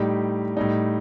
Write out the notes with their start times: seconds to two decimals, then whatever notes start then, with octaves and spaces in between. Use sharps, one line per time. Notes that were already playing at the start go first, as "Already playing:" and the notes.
Already playing: A2 G3 D#4 G4
0.57 A2 G3 D#4